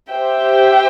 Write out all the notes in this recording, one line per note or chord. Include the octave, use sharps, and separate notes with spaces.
G4 C5 E5 G5